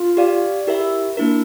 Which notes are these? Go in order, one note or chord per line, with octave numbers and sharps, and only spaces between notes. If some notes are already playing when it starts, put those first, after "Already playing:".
Already playing: F4
G4 D5 F5
E4 G4 A#4 E5
A#3 D4 E4 A#4